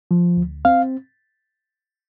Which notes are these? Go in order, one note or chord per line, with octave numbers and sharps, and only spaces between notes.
F3
D2
C4 F5